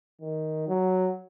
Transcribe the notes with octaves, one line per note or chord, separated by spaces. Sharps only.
D#3
F#3